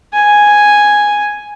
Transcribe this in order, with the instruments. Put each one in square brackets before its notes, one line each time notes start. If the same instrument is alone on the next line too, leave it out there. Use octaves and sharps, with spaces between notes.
[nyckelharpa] G#5